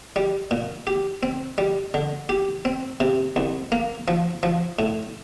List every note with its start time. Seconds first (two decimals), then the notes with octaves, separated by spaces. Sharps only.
0.16 G3
0.51 A#2
0.87 G4
1.23 C4
1.58 G3
1.94 D3
2.29 G4
2.65 C4
3.00 C3
3.36 C2
3.72 A#3
4.08 F3
4.43 F3
4.79 A2